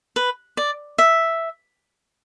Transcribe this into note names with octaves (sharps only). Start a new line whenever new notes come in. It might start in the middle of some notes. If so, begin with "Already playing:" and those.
B4
D5
E5